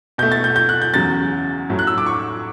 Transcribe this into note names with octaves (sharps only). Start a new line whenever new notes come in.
B2 A3 G6
A6
G6
G6
F#6
G6
E2 C#3 F#3 A6
A2 F#3 A3
F#6
E6
D6
C#6